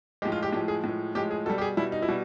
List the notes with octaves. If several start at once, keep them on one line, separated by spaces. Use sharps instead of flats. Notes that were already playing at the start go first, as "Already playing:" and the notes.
A2 F3 G#3 G4
F4
G4
A2 F3 G#3 G4
G#4
A2 F3 G#3
A2 F3 G#3 G4
G#4
B2 G3 A4
G4
G#4
B2 G3 E4
D#4
E4
B2 G3